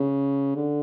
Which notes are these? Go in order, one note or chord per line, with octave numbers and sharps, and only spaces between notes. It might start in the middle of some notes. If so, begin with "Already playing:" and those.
Already playing: C#3
D3